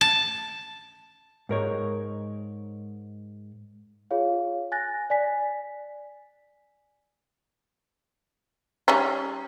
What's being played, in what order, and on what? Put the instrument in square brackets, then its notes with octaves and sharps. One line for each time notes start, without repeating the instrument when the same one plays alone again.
[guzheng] A5
[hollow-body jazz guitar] G#2 A#4 C#5
[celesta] F4 G#4 C#5 F5
G#5 F#6 A6 A#6
D5 G#5 B6
[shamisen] G3 C#4 D#4